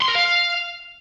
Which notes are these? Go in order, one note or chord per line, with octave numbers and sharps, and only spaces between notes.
C6
A#4
F5